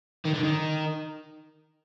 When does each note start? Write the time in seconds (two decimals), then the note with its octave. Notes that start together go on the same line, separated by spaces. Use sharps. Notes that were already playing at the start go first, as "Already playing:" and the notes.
0.25 D#3
0.33 D3
0.43 D#3